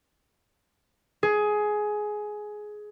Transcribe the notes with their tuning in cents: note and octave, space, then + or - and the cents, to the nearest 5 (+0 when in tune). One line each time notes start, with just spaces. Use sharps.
G#4 +15